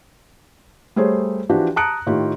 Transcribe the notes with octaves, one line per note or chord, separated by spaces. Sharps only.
G3 A3 G#4 C5 C#5
E3 F3 D4 F#4 G4
A5 A#5 D#6 F#6 C#7 D7
A2 D#3 F4 G4